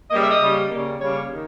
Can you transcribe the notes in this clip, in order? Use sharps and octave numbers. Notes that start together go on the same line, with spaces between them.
C#3 G3 A#3 D#5
E5
D#5
C#3 G3 A#3
C#3 G3 A#3
C#3 G3 A#3 C#5
D#3